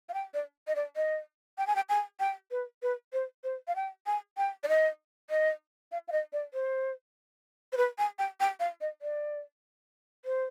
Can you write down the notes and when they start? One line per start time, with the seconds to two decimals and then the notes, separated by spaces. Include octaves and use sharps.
0.09 F5
0.14 G5
0.34 D5
0.67 D#5
0.75 D5
0.96 D#5
1.58 G5
1.67 G#5
1.76 G5
1.89 G#5
2.20 G5
2.51 B4
2.82 B4
3.13 C5
3.44 C5
3.67 F5
3.76 G5
4.06 G#5
4.37 G5
4.63 D5
4.68 D#5
5.30 D#5
5.92 F5
6.08 F5
6.12 D#5
6.33 D5
6.54 C5
7.72 C5
7.77 B4
7.98 G#5
8.19 G5
8.40 G5
8.60 F5
8.81 D#5
9.02 D5
10.25 C5